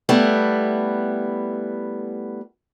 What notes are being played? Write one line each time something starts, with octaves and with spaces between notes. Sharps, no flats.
G3 A3 B3 E4